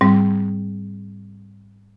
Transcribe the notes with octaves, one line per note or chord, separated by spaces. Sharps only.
G#2 G3 C4